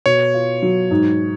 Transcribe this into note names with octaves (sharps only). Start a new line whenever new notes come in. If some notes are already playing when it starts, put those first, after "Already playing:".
B2 C#5
F4
F#3
G#2